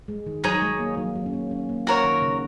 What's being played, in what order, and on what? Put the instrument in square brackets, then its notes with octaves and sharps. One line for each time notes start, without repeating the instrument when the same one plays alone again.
[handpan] G#3
D#3
[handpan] F#3 [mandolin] D#4 G#4 C#5
[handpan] G#3
A#3
F#3
F#3
C#4
A#3
C#4
A#3
[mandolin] F#4 A#4 C#5
[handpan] D#3
C#3